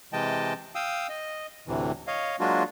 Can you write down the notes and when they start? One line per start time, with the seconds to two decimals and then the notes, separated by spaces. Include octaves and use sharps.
0.13 C3 E3 G#3 D#5 G5 A5
0.75 F5 G5 D#6 E6
1.09 D#5
1.67 D2 A2 C3 E3
2.07 C#5 D#5 F5
2.40 F#3 G#3 A#3 D4 F4 F#4